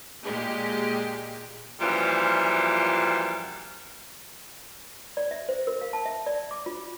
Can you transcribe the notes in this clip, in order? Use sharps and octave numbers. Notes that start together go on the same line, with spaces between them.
A#2 G#3 G4
F#2 A#2 E3 F3 G3
D5
E5
C5
A#4
F5
A5
E5
D5
D6
F4